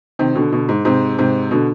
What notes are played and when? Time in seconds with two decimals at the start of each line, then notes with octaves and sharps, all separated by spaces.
0.19 C3 D#3
0.35 B2 D3
0.52 B2 D3
0.69 G#2
0.85 G#2 C3
1.19 G#2 C3
1.51 B2 D3